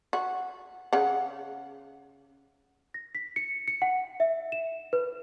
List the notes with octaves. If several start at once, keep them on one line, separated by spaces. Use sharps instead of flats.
F#4
C#3 F#5
A#6
B6
C#7
C#7
F#5
E5
E7
B4